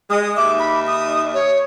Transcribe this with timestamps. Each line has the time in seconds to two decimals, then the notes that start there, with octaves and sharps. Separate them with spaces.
0.10 G#3 D#6
0.37 D#2 D#4 E5 D6
0.59 B5
0.87 D#6
1.34 C#5